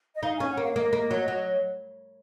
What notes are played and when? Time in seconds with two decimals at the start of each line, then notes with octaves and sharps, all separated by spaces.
0.15 D#5
0.23 D#4 F5
0.36 C#4 G#5
0.49 F#5
0.57 A#3 F5
0.70 C#5
0.75 A#3 D#5
0.93 A#3
1.11 F#3
1.28 F#3